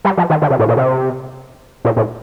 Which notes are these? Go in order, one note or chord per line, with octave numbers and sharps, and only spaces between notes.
G3
F3
D#3
D3
C3
A2
A#2
C3
A#2
A2